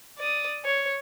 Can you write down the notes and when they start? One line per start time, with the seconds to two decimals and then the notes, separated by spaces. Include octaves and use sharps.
0.19 D5 D#6
0.65 C#5